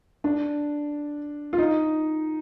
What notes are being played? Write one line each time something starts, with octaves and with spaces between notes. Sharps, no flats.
D4
F4
D#4